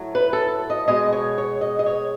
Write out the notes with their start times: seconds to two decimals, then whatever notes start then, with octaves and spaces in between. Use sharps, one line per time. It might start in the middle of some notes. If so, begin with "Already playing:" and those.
Already playing: A2 F#3 A3
0.15 B4
0.33 A4
0.70 D#5
0.88 B2 G#3 D#5
1.13 C#5
1.38 C#5
1.61 D#5
1.79 D#5
1.86 C#5